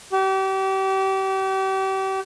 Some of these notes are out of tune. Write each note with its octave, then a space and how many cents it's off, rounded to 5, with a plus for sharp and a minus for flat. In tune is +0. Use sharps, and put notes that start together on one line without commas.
G4 -35